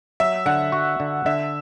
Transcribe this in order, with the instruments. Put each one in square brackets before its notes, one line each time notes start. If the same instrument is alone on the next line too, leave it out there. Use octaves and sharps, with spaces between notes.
[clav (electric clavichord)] F#3 [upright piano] E5
[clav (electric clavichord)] D3 [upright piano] F#5
[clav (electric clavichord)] F#4
D3
[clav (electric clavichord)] D3 [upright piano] E5